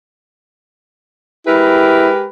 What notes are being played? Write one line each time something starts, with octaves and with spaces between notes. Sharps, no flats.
G#3 E4 G4 A#4 B4